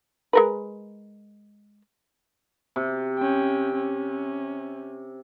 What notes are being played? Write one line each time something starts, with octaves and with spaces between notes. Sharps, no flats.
G#3 A#4 B4
C3
C#4 G5
C#4